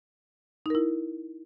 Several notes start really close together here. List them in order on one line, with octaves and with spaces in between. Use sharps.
D#4 A#4 E4